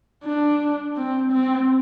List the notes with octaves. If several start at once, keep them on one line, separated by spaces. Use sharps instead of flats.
D4
C4
C4